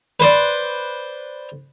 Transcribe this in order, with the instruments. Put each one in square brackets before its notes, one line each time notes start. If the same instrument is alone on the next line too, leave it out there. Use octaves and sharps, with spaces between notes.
[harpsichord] B4 C5 D5